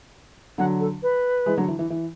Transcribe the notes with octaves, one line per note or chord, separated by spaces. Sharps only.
D3 F#3 F#5
A4
B4
E3 G#3
D3 F#3
E3
E3
E3